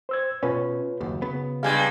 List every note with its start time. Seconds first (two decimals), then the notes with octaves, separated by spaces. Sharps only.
0.09 C5 E6 G#6
0.43 B2 C#4 F4 B4 C#5
1.01 F#1 D#2 F#4
1.22 C#3 B3
1.63 G2 G3 G#3 F5 G#5 G#6